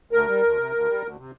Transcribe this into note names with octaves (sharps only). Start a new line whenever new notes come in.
D2 A#4
G3
D2
C3
D2
G3
D2
C3